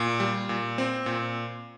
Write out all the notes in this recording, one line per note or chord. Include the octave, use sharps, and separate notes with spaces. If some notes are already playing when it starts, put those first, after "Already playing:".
Already playing: A#2
G3
A#2
C4
A#2